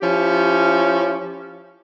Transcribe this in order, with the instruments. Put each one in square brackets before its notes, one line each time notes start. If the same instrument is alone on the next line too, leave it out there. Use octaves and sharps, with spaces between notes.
[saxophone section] F3 C#4 E4 G4